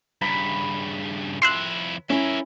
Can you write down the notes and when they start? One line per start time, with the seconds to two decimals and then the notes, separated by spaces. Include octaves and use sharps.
0.22 G2 C#3 B5
1.42 F2 E4 C6 E6 F#6
2.10 C#4 E4 A#4 E5